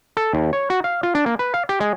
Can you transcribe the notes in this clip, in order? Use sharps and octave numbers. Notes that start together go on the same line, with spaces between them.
A4
D#2
C#5
F#4
F5
F4
D4
A#3
B4
F5
G4
G#3